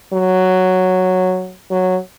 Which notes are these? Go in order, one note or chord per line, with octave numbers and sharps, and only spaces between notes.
F#3
F#3